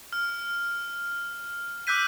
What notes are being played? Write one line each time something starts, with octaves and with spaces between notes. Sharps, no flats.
F6
D6 E6 F#6 G6 B6 D#7